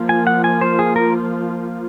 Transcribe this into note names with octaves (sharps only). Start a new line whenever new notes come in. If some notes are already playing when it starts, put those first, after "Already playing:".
Already playing: F3 A#3 F4
G#5
F#5
G#5
C5
G#4
A#4